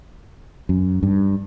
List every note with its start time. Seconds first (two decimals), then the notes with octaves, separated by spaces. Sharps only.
0.69 F#2
1.03 G2